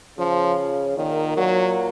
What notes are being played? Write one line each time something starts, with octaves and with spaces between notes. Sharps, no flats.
C#3 F3
A#2 D#3
A#2 F#3